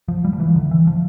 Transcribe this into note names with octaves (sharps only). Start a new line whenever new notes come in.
F3
G3
F3
E3
D3
E3
F3